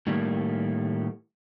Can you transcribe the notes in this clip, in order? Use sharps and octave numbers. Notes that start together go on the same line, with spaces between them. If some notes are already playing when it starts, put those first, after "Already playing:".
A2 D#3 G3 A3 A#3